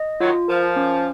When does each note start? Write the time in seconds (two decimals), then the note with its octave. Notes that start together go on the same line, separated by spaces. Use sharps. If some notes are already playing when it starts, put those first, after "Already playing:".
Already playing: D#5
0.20 D#3 F#3 F4
0.48 F3 A#4
0.76 C#4